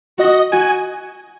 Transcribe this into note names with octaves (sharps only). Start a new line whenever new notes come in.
F#4 D#5
F#4 G#5